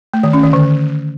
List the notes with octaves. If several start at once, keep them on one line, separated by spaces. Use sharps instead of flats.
A3
D#3
C#4
D#3
D3